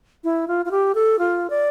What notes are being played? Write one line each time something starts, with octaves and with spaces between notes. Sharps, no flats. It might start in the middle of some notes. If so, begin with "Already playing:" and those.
E4
F4
F4
G4
A4
F4
D5